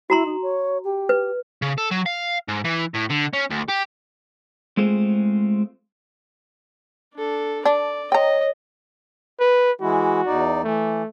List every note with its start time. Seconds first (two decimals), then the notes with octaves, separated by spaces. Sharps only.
0.10 E4 F#4 A#5 C6
0.26 D#4
0.42 C#5
0.84 G4
1.09 B4
1.62 C#3
1.78 A4
1.91 F#3
2.06 F5
2.49 G#2
2.65 E3
2.95 A2
3.10 D3
3.33 C#4
3.50 D2
3.68 G4
4.77 G#3 A3 C4 F4 G#4 C5
7.15 D4 A4
7.65 D4 D5
8.12 C#5 D#5 G5 A#5
9.40 B4
9.81 E3 G#3 E4 F#4
10.26 E2 D#4 D5
10.64 E3 A3